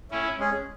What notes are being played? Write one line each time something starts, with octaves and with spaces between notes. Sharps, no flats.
A2 C#4 E4
G#3 C#4 G#4